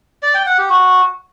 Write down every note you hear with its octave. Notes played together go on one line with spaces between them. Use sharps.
D5
G5
F#5
G4
F#4